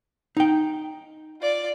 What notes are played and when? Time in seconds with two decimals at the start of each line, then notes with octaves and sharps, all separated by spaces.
0.37 D#4 G5
1.41 F4 D5